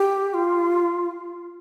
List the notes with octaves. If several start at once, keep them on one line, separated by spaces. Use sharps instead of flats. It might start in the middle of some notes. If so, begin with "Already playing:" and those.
Already playing: G4
F4